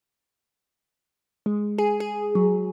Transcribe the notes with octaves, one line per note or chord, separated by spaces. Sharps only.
G#3
G#4
G#4
F#3